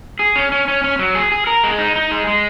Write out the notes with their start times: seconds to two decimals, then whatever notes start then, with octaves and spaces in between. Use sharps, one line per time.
0.19 G#4
0.36 C#4
0.52 C#4
0.68 C#4
0.84 C#4
0.99 F#3
1.15 G#4
1.32 G#4
1.47 A#4
1.64 G#3
1.79 D#4
1.96 D#4
2.11 G#3
2.27 G#3